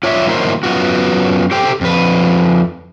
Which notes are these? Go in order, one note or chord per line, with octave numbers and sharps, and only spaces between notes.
F4 C#5 D5 E5
D#3 F#3 A#3 E4 A#4 C5
F#2 C3 B3 F4 F#4
G4 A4 C5 G5
F2 B4